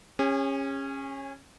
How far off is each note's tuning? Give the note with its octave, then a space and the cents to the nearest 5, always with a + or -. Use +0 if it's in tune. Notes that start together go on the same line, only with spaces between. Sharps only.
C#4 -15 G#4 -45